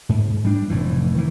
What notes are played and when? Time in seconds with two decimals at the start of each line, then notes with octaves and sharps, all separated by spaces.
0.09 G#2
0.45 G3 D4
0.70 F1 A2 E3
1.15 D#3 E3